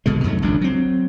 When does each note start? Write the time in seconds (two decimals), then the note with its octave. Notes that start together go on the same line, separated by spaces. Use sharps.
0.06 G#1 B2 D3 G#3
0.24 F2 G#2 F#3 A3
0.42 G#1 C#2 F#2 D4
0.61 F#3 C4